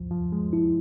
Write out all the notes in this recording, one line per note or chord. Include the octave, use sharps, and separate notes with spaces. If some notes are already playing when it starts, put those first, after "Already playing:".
Already playing: C2 F3
F3
G#3
F3 E4